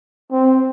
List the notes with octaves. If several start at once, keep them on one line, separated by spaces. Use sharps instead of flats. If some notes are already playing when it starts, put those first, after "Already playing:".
C4